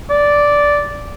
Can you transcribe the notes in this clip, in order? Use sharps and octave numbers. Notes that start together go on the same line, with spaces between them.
D5